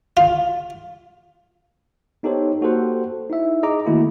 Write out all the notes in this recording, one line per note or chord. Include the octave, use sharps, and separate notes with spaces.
F4
B3 D#4 G4 A4 C5 C#5
A#3 F#4 G4 A4 C5 F#5
D#4 E4 E5
G#4 D#5 A#5 D6
D#3 A3 A#3 E4 F#4